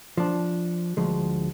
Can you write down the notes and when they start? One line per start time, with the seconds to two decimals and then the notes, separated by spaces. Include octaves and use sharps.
0.17 F3 D4
0.97 D2 F3 G#3